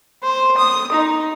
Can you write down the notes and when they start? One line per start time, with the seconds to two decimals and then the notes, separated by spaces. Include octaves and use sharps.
0.23 C5
0.58 D#6
0.92 D#4